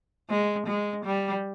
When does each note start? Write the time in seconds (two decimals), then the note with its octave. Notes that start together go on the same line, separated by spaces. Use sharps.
0.30 G#3
0.67 G#3
1.05 G3